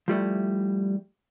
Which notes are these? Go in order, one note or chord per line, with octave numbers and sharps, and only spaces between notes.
F3 G3 A3 E4